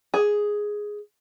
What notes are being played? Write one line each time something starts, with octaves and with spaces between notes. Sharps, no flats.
G#4